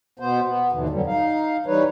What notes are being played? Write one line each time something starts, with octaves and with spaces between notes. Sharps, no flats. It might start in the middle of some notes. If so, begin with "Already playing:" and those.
B2 B3 C5
B3
D#2 G#2 B2 D3 E3
F2 D3 F#3 G3
D#4 F5
E3 G3 D#4 B4 C#5